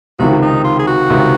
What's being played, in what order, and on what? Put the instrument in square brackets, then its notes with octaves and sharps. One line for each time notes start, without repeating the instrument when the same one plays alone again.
[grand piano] C#2 C3 D#3 [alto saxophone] F#4
[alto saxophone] D#4
F4
G#4
F#4
[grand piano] C#2 C3 D#3